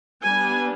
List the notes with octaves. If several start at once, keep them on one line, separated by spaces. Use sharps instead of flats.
G3 B3 D4 G#5